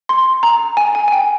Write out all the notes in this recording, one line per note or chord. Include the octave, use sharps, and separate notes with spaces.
C6
A#5
G#5
G#5
G#5
G5